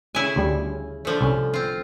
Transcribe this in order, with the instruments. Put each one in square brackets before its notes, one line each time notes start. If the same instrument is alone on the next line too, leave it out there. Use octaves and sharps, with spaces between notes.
[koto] C#3 E4 G#5
[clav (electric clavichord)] D2 G3
[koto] D3 F3 A3
[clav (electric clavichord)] C2 C#4
[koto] C4 F4